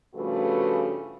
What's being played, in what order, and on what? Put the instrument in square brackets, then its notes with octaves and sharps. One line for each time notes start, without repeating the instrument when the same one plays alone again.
[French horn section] G2 C#3 F3 A3 F#4 B4